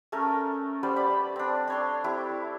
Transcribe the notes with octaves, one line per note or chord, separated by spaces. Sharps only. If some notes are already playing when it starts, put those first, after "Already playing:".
A3 C#4 A4 A#4
G3 B3 C5 D5
D5 B5
C4 D4
D4 C#5 C6
C4 E4 G4